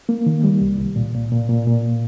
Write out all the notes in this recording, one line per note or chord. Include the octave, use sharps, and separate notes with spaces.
A#3
D#3
G3
C2
C2
A#2
A#2
A#2
A#2
A#2